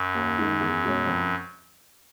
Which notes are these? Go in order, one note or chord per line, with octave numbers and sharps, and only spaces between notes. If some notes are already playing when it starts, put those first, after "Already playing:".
Already playing: F#2
D#2
D#3 G#3
E2
B2 G#3 C#4
F2